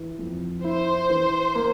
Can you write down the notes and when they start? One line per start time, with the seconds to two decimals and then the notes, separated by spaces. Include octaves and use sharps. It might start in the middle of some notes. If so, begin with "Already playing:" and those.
Already playing: E3
0.19 F2
0.64 E4 C5
1.10 E3
1.55 A#3